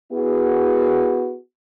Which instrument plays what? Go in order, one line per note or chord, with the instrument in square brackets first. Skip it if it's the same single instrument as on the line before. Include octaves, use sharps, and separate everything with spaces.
[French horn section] B3 E4 F#4 G#4